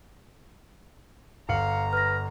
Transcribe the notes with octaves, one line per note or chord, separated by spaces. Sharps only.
G1 F5 A#5 C#7 F#7
B4 F6 A#6